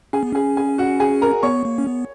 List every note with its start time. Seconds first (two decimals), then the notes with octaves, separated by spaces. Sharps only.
0.13 C#4 G#4 G#5
0.23 B3
0.33 C#4 G#4 G#5
0.57 G#4 G#5
0.78 F#4 F#5
1.00 G#4 G#5
1.22 A#4 A#5
1.43 B3 C#5 C#6
1.65 A#3
1.78 C#4
1.87 B3